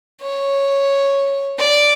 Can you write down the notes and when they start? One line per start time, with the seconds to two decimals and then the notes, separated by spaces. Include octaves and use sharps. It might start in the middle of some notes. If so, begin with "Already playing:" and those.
0.21 C#5
1.59 D5